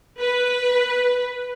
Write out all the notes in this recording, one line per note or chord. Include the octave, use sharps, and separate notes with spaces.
B4